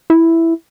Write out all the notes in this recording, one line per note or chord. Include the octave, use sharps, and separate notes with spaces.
E4